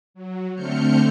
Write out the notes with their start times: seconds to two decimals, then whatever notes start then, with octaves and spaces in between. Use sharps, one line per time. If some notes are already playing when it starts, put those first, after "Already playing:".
0.14 F#3
0.55 D3 A3 C4 F6 G6 C#7